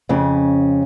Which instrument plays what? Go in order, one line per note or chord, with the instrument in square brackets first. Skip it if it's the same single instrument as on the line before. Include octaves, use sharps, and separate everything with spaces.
[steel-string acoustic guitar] F2 C#3 C#4